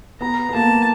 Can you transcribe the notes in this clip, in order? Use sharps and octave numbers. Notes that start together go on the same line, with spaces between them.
B3 A#5
B3
A#3 A5